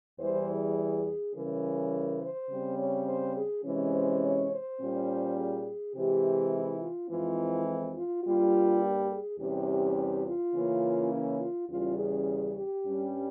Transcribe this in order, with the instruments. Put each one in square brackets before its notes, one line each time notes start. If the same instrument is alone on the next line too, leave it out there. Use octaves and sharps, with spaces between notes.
[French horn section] E2 E3 G3 C5
G#4
C#3 E3 G3 C#4 A#4
C5
C#3 G3 C4
C#5
C5
G#4
C3 E3 G#3 C#4
C5
C#5
C5
A#2 G3 C#4
G#4
C3 E3 G#3 G4
E4
F4
F2 E3 G#3 C4 F4
E4
F4
G2 G3 A#3 F4
G4
G#4
E2 C3 G3 C#4 G4
F4
C#3 E3 A#3 C#4
E4
F4
E2 C#3 G3 C#4 F4
G#4
G4
G2 G3 C#4